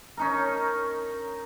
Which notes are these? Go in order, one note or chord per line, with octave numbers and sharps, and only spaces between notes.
C#4 D#4 A#4